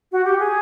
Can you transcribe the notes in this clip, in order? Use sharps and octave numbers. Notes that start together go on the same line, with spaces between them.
F#4
G4
G#4